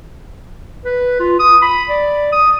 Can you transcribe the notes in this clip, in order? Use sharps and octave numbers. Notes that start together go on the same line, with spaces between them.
B4
F4
D#6
B5
D5
D#6